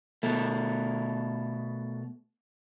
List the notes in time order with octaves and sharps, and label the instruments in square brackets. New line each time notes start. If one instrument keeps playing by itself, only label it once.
[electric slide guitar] B2 A3